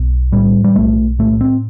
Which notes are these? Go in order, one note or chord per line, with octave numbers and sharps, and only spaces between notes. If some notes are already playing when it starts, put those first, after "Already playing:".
Already playing: B1
A2 G3
G3
B1 A3
A2 A3
C4